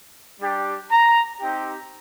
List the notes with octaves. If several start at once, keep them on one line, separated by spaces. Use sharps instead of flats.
G3 D4 G4
A#5
C4 D#4 G4